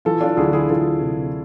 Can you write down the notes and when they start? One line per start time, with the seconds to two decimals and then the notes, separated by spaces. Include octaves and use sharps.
0.05 E3 F4 A4
0.21 D4 F4
0.37 D2 E4 G#4
0.53 E4 G#4
0.69 D2 F4 A4
1.01 C3